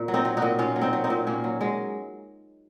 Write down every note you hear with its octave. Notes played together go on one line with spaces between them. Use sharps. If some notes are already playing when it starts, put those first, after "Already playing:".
Already playing: A#2
F#3
C4 D#4
F#3
D#4 F#4
A#2
A#2 C#4 F4
F#3
C4 D#4
F#3
C4 D#4
A#2
A#2 A#3 C#4
F#3
F#3 G#3